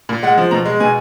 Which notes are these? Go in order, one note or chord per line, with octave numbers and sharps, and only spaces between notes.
A#2
G#3 F#5
F3
B2 A#5
G#3
B2 G#5